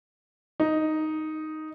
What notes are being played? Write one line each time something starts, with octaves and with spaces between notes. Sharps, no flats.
D#4